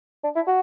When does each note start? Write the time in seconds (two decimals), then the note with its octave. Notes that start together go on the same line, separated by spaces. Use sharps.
0.24 D4
0.35 E4
0.47 F#4